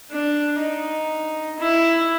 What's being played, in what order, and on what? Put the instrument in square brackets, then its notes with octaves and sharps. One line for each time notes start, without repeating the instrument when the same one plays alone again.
[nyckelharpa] D4
D#4
E4